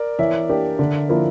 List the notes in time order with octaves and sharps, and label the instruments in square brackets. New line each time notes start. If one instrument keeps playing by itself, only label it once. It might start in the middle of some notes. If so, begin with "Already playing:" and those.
Already playing: [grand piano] A#4 D5
[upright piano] E3 [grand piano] C#5 E5
[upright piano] A#3 D4 G4
D3
F3 A#3 E4